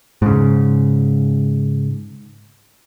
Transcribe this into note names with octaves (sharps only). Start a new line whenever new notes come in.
G#2 C#3